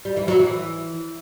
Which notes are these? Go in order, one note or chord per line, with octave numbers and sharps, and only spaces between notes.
G3
E3
F#3
E3